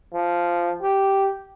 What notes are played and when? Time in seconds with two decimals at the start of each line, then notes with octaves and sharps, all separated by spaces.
0.14 F3
0.82 G4